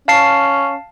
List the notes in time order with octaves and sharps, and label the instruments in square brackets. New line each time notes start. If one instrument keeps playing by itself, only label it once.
[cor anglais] C#4 [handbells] F5 A5 C7